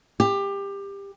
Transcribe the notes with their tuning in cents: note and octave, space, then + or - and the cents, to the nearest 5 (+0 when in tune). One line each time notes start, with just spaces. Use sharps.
G4 +20